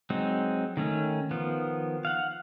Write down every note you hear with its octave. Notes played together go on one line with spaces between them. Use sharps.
F#3 G#3 C4 D#4
D#3 A3 C#4
D#3 F3 B3
F5 F#5